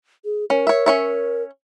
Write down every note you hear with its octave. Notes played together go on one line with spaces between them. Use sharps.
G#4
C#4 A#4
C#5 E5
C#4 C#5 E5